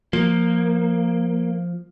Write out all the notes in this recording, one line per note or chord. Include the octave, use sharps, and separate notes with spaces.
F3 A#3